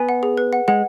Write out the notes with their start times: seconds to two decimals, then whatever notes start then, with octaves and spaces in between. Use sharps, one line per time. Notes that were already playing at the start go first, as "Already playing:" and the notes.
Already playing: B3 G#5
0.09 F#5
0.23 G#4
0.37 B4
0.53 F#5
0.68 G#3 F#5